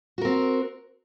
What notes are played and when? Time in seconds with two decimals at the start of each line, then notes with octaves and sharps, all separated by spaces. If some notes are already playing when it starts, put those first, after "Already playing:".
0.18 F#4
0.21 A#4
0.25 C4